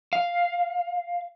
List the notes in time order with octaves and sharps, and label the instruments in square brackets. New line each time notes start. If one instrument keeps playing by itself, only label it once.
[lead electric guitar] F5